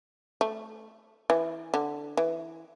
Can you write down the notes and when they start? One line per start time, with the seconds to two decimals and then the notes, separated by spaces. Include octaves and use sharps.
0.41 A3
1.30 E3
1.74 D3
2.17 E3